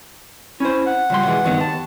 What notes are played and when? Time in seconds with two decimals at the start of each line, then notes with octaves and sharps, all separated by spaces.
0.60 C#4 E4 C5
0.86 F#5
1.10 C#2 G3 C6
1.25 B2 E3 G#3
1.44 G2 D#3 B3
1.60 D#2 A5